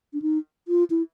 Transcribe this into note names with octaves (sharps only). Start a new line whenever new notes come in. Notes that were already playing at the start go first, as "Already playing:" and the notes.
D4
D#4
F4
E4